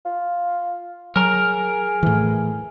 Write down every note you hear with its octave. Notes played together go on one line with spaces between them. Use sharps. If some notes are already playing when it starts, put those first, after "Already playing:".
F4
F#3 G#4 A#4 A#5
A2 E3